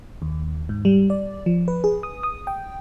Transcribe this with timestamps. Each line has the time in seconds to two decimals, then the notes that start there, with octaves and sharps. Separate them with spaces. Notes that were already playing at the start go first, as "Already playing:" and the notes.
0.22 D#2
0.69 G#2
0.85 G3
1.10 D5
1.46 F3
1.68 B4
1.84 G#4
2.03 D#6
2.23 D#6
2.47 G5